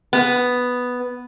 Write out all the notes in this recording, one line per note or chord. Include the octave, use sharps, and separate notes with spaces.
B3